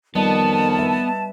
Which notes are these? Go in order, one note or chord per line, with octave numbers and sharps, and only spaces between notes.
F2 D#3 G3 B3 D5 D#5 A5
B4 E5